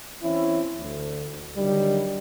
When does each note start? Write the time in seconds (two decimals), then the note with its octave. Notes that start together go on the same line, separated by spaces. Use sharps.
0.23 E3 C4 C#4 E4
0.78 D2
1.57 D3 D#3 F#3 G3